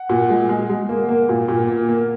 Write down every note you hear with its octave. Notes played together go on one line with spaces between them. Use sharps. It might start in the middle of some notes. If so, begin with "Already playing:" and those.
Already playing: F#5
A#2
G#3
G#3
G#3
A#3
A#3
A#2
A#2
A#3
A#3